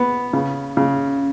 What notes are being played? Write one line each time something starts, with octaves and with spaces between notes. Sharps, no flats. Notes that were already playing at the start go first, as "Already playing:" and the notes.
Already playing: B3
C#3
C#3